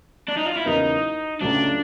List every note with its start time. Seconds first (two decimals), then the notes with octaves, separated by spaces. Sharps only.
0.29 D4
0.37 D#4
0.46 F4
0.57 E4
0.66 E2 C#3 F#3 A#3 D#4
1.41 C#2 C#3 F#3 A3 D4